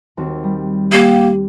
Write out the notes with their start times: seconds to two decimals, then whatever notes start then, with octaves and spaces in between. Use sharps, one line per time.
0.17 D#2 C4 F#4
0.44 G3
0.92 A#3 G4